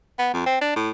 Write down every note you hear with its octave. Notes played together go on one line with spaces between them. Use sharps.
B3
F2
C4
D4
A2